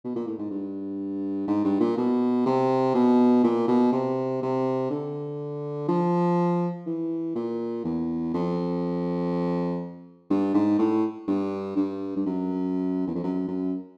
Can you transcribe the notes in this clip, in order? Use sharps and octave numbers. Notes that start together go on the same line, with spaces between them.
B2
A#2
A2
G#2
G2
G#2
G2
A#2
B2
C3
B2
A#2
B2
C3
C3
D3
F3
E3
A#2
E2
F2
G2
G#2
A2
G2
G2
G2
F#2
E2
F2
F#2
F#2